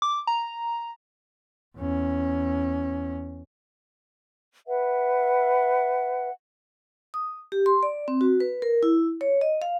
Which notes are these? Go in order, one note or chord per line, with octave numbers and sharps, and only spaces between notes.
D6
A#5
E2 C#4
B4 E5 F#5
D#6
G4
C6
D5
C4
F#4
B4
A#4
E4
C#5
D#5
F5